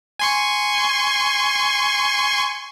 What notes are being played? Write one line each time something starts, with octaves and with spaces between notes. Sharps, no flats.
G#5 C6 C#6